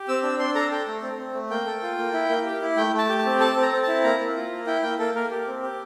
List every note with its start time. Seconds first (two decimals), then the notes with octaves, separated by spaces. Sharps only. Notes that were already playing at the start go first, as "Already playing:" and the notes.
Already playing: G4
0.08 C4 E6
0.23 D4 E6
0.39 D4 C6
0.55 A4 A#5
0.72 A4 G5
0.87 A3
1.02 C4
1.18 C4
1.34 A3
1.50 A#3 G5
1.66 A4
1.83 F4
1.98 A#3
2.13 E4
2.29 A#3
2.45 G4
2.62 E4
2.77 A3 G5
2.94 A3 A5
3.09 G4
3.19 A5
3.25 C4
3.40 A4 A5
3.56 C4
3.62 A#5
3.73 C4
3.83 E4 A5
4.03 A#3 A#5
4.20 A#3
4.36 F4
4.52 A#3
4.67 E4 G5
4.83 A#3 G5
4.99 A#3 A4
5.15 A#3 A#4
5.31 G4
5.47 C4
5.63 G4